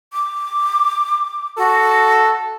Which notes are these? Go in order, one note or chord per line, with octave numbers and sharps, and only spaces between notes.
D6
F#4 A4